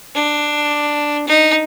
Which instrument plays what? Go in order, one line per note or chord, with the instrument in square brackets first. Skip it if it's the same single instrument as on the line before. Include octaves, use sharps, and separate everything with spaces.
[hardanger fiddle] D4
D#4